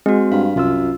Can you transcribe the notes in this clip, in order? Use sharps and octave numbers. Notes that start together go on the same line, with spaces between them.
G#3 C4 F#4
G2 F5
C2 F#2 F4 E6